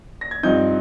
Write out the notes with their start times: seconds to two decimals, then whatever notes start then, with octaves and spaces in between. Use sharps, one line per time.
0.21 A#6
0.31 G#6
0.43 G2 F3 C4 D#4 G6